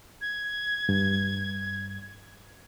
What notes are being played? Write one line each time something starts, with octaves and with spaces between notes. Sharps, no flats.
G#6
G2